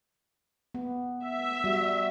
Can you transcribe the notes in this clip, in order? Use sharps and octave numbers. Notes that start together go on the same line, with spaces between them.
B3
E5
G3 F#4